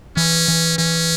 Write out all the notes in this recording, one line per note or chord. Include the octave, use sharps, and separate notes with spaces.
E3 C#4
E3
E3 C#4